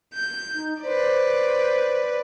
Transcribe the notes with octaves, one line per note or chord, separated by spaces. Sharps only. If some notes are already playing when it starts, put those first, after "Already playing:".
G6
D#4
B4 C5 D5